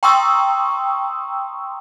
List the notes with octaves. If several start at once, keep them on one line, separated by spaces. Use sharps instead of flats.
G5 A#5 C6 C#6 D#6 E6